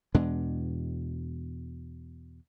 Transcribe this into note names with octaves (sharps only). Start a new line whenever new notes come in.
E2 B2 G#3 D4